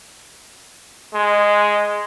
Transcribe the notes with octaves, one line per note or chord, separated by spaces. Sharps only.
G#3